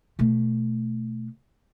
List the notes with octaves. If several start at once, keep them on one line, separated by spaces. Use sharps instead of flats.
B2 A3